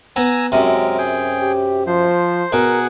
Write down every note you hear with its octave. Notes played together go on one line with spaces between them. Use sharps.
B3 G#5 A#5 E6
F#2 C3 G#3 A#4
G#4 G5
G4
F3 C5
B2 G#4 A#4 F#5